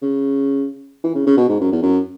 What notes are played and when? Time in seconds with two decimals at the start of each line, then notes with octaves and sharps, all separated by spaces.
0.02 C#3
1.04 E3
1.15 C#3
1.27 C#3
1.37 B2
1.49 G#2
1.61 F#2
1.72 E2
1.82 F#2